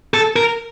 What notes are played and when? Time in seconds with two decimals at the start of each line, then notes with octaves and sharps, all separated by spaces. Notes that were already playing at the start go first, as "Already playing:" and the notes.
0.14 A4
0.36 A#4